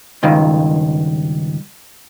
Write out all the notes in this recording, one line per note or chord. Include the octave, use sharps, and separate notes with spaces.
C#2 G2 D#3